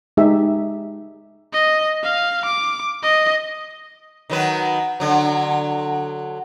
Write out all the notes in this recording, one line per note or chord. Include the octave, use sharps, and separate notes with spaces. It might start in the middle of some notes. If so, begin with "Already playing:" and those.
G#3 D#4 G4 G#4 E5
D#5
F5
D6
D#5
D#3 F#3 B4
D3 F#3